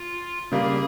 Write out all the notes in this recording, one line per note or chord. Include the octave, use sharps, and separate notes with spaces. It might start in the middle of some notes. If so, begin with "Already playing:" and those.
Already playing: F4
C#3 G3 A#3 G#4